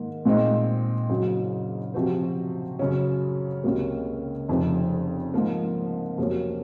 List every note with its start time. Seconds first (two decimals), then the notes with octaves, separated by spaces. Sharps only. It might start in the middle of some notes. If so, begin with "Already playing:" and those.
Already playing: G#2 D#3 A#3
0.25 A#2 G#3 C4 D#4
1.09 F#1 F#2 C#3 F#3
1.94 C3 F3 C4 F#4 C5
2.79 F#2 C#3 F#3 C#4
3.64 C#2 C3 F#3 A#3 C#4
4.48 F1 F2 C#3 F3
5.34 G#2 F3 A#3
6.18 F2 C3 F#3 A#3 C#4